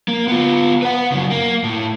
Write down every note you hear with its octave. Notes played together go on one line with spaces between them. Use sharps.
A#3
B3 F4
B4 F#5
F#2 C#3
A#3
A2